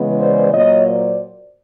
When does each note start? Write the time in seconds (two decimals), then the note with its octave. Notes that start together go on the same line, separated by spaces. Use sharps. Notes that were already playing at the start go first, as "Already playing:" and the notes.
Already playing: C#3 E3 G#3 B3
0.19 C5 D5
0.53 A#2 F#3 A#3 C#5 D#5
0.87 C5 D5